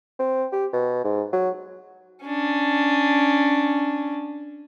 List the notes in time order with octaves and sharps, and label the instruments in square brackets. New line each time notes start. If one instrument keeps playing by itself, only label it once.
[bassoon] C4
G4
B2
G#2
F#3
[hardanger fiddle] C#4 D4